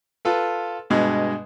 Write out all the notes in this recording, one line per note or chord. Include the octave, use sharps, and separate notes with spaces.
F4 A4 B4
G2 B2 G#3